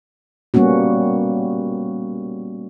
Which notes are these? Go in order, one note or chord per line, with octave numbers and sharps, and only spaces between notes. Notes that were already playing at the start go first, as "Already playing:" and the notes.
G3 A#3 B3 C#4 F#4